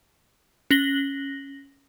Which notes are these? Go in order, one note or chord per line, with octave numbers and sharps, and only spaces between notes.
C#4 A#6 F#7 G7